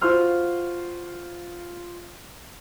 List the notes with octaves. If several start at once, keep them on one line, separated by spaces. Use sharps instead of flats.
F4 F#4 C5 C6 F6